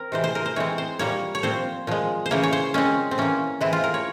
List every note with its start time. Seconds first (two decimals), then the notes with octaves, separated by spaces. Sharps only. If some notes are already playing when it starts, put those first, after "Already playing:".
Already playing: C4 A#4
0.12 C3 E3 G#3 C5
0.24 C5
0.35 A#4
0.46 C5
0.56 E3 G#3 C4 C#5
0.78 C5
0.99 A#2 G3 A#3 C#5
1.35 C#5
1.43 A#2 F3 C4 C5
1.87 A#2 F3 G#3
2.26 C5
2.31 C#3 E3 A#3 C#5
2.43 C#5
2.53 C5
2.74 A#2 G#3 C4 C#4
3.11 C4
3.18 E3 A#3 C#4
3.61 E3 G#3 C4 E4
3.73 F4
3.84 A#4
3.94 C#5